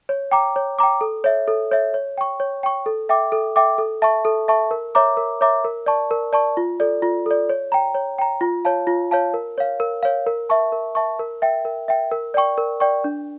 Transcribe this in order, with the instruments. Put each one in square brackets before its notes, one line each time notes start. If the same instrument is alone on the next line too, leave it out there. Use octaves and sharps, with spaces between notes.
[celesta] C#5
G5 A#5 D6
C#5
G5 A#5 D6
A4
C#5 E5
A4
C#5 E5
C#5
G5 C#6
C#5
G5 C#6
A4
E5 G5 D6
A4
E5 G5 D6
A4
E5 A5 C#6
A4
E5 A5 C#6
A#4
C#5 E5 A#5 D6
A#4
C#5 E5 A#5 D6
A#4
D5 A5 C#6
A#4
D5 A5 C#6
F4
A4 D5
F4
A4 D5
C#5
G5 A#5
C#5
G5 A#5
F4
C#5 F5 A5
F4
C#5 F5 A5
A#4
C#5 F5
A#4
C#5 F5
A#4
E5 A5 C#6
A#4
E5 A5 C#6
A#4
E5 G5
A#4
E5 G5
A#4
D5 G5 C#6
A#4
D5 G5 C#6
D4